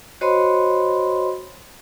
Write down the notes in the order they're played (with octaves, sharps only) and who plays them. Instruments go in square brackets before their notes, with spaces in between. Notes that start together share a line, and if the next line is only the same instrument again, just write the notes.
[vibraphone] F#4 C5 C#5 D#5 B5 C6